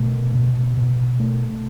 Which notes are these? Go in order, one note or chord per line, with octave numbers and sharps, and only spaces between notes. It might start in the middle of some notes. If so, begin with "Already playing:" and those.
Already playing: B2 A3
B2
B2
A3